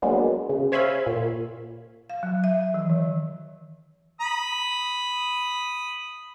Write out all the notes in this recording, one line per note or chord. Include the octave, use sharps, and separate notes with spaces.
F#3 G#3 A#3 B3 D4
C#3
C5 C#5 E5 F5 G#5 B5
A#2
F5
F#3
E5
E3
D#3
B5 D#6